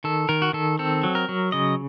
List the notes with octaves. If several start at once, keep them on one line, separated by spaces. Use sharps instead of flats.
D#3 A4
D#3 A#4
F#4
D#3 A4
C4 A4
F#3
A#4
F#3
C#3 D#5